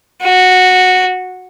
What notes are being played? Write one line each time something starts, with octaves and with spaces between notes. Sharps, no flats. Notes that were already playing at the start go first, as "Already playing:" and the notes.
F#4